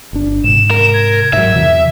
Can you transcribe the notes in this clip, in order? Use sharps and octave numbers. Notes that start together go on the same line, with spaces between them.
G1 D4
G#2 C3 E7
A#4
G#6
G#2 F#3 E5
E2 C3 E3